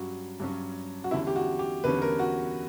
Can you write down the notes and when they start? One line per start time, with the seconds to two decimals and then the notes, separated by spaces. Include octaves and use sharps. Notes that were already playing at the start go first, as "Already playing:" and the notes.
Already playing: G2 F#3 C#4 F#4
0.40 G2 F#3 C#4
1.04 F#4
1.11 E2 D3 G3 C#4 E4
1.27 G4
1.36 F#4
1.59 G4
1.84 E2 D3 G3 C#4 B4
2.02 A#4
2.19 F#4